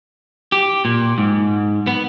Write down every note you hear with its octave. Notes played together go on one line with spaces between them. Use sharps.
G4
A#2
G#2
B3